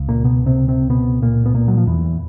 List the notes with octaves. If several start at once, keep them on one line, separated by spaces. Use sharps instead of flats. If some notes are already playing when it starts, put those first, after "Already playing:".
Already playing: C#2 C#3
A#2 A#3
B2 B3
C3 C4
C3 C4
B2 B3
A#2 A#3
B3
A#2 A#3
F#3
F3
E2 E3